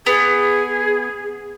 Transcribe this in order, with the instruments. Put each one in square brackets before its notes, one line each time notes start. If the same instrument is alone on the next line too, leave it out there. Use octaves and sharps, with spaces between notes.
[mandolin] B3 [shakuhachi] G#4